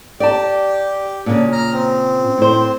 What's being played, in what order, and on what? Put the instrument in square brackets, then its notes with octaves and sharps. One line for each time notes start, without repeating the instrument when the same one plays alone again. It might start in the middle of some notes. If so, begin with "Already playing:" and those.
[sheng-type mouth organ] G4 [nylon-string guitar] D5 A5
[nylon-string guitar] A#2 C#3 [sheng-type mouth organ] D4
[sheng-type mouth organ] A#5 F6
C4
[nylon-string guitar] A2 C5